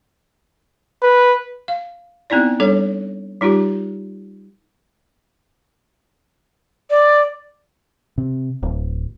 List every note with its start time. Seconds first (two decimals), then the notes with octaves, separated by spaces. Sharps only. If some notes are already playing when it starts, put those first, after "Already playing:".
1.02 B4
1.68 F5
2.30 B3 C4 D#4 E4 D5
2.60 G3 D4 A4 C#5
3.41 G3 D#4 F4 G4
6.90 D5
8.18 C3
8.63 D1